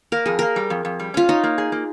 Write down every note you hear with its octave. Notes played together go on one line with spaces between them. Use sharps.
A#3 A#4
F2 G#4
A#3 A#4
G3
F2
F2
G3
C#4 F4
D#4 C#5
A#3
G#4
A#3